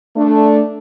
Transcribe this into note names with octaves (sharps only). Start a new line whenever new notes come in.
A3 D4